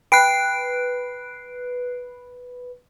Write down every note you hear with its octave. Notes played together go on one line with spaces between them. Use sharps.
B4 G5 F#6 C7 D7